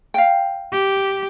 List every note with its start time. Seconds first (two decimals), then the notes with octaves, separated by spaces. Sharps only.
0.14 F5 G5
0.73 G4